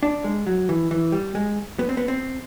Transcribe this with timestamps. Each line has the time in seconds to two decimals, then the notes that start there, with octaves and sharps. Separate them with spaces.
0.03 D4
0.24 G#3
0.47 F#3
0.69 E3
0.91 E3
1.12 G3
1.35 G#3
1.79 B3
1.89 C4
1.97 B3
2.08 C4